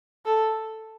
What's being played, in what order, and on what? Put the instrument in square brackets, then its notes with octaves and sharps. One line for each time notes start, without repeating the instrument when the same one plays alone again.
[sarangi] A4